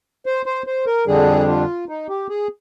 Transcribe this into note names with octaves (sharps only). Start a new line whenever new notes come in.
C5
C5
C5
A#4
F2 D3 G3 D4 G#4
F4
D#4
G4
G#4